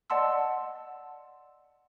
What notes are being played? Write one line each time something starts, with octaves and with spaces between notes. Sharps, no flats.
D5 D#5 F#5 A5 C6 E6